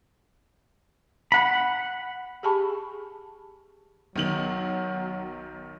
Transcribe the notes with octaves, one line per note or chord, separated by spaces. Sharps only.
F#5 B5
G4 G#4 G#5 A5 B5 C#6
B1 D#3 F#3 F#7